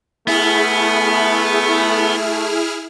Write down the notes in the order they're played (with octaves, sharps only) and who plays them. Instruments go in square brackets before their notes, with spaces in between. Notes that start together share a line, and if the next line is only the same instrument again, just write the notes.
[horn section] A3 [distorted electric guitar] B3 [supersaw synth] E4 G#4 F6